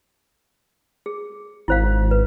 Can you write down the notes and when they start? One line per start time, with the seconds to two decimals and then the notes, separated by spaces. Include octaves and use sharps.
1.06 G#4
1.68 G#1 E4 C5 F5
2.11 B4